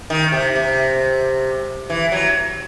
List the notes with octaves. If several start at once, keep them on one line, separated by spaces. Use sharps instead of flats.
D#3
C3
C3
E3
F#3